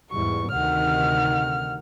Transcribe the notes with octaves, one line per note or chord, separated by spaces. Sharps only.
E2 G#2 G3 C#6
D2 C3 D#3 F#5 F6